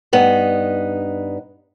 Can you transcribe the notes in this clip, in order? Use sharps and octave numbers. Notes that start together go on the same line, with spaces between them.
G2 B3 D#4